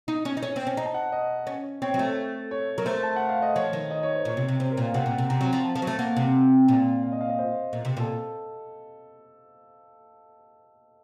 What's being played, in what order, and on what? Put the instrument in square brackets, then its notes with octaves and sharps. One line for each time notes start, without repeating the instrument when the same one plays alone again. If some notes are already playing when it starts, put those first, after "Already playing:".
[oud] D#4
C#4
D#4
C#4
C4
C#4
[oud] D#4 [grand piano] A#5
[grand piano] A5
F#5
D#5
[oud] C#4
[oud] C4 [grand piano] C#5
[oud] F#3
A3
[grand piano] C#5
[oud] F#3 [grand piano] A#4
[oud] A3 [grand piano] C5
[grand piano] A5
F#5
F5
D#5
[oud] F3 [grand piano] C#5
[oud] D#3
[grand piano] D#5
C#5
C5
[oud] A#2 [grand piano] C#5
[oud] C3
C3
[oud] C3 [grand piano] C5
[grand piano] A#4
[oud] A#2
[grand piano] F5
[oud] C3 [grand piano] F#5
[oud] A#2
C3
[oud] C3 [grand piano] A#5
[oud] F#3
F3
[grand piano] A5
[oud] F3
F#3
A3
[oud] A#3 [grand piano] F#5
[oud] C3
A#2
[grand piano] F5
D#5
F5
D#5
C5
[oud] A#2
C3
[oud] A#2 [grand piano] A4